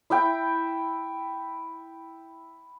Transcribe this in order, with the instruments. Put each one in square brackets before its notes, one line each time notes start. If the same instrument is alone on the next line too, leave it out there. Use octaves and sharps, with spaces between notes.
[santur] E4 E5 G5